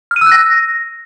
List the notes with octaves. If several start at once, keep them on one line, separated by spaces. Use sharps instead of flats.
F6
D#7
E6
F#6
A#6